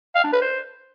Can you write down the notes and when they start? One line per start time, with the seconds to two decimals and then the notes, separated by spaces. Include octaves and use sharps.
0.15 F5
0.24 D4
0.33 B4
0.42 C5